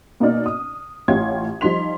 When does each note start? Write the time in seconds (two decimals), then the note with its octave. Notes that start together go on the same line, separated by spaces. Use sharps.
0.20 B2 A#3 C#4 D#4 D5 F6
0.46 D#6
1.08 A1 F4 G4 C#5 C6 G#6
1.61 F3 G3 D#4 C6 B6 F7